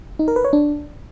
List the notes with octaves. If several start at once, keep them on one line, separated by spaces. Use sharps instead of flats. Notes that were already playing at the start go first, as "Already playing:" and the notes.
D#4
A#4
B4
C#5
D4